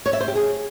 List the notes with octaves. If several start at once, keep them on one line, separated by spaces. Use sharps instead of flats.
C#5
E5
C5
G4
G#4